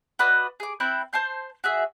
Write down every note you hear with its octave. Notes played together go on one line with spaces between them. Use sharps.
F#4 B4 D5 D#5
G#4 D6
C4 E4 G5 F#6
C5 A5 C6 G6
F#4 G#4 E5